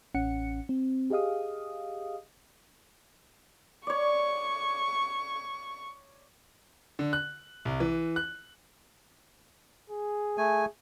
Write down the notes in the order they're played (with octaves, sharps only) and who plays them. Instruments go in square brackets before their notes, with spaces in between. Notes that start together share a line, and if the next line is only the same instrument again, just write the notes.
[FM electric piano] A1 C#4 F#5 C#7
C4
G4 G#4 D#5 F5 D#6
[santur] C#5 D5 [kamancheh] C#6
[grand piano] D3
F#6
C2
E3
F#6
[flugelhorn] G#4
[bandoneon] A3 G#5